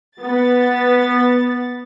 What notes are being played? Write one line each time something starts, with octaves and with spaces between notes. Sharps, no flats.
B3 A6